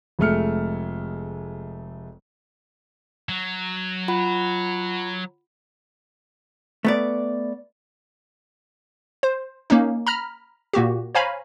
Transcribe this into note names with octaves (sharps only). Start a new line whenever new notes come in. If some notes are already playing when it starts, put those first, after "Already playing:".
F1 G#3 A3 F6 C#7
F#3
F4 F#5 B5
A3 B3 D5
C5
A#3 C#4 D#4
A#5 B5 F6
A#2 A#3 F#4 G4
C5 C#5 F5 G#5 A#5 B5